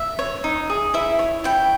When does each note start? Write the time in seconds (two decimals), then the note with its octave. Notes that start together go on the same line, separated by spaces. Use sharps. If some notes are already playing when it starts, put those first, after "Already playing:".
Already playing: E5
0.19 C#5
0.44 D#4
0.70 G#4
0.94 E4 E5
1.19 C#5
1.44 E4 G5